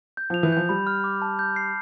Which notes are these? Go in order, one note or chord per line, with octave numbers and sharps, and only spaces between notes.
G6
F3 F7
E3
F3 G6
G3 B5
F6
D6
A5
G6
C7